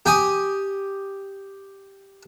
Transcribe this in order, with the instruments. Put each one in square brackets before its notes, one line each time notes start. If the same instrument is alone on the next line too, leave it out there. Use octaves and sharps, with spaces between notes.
[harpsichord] G4 G#5 D#6